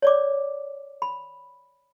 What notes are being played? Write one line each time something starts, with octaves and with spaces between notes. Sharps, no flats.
C#5 D5 D6
B5